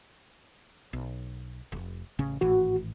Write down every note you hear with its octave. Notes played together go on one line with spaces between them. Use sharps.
B1
F1
A1 C#3 C#4
G#1 A2 E3 F#4